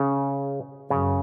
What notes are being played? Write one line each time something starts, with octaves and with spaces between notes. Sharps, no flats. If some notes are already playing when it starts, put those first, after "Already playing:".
Already playing: C#3
F#2 C#3